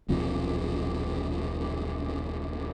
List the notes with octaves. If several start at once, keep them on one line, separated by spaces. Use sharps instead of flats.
D#1 B1 F3 C4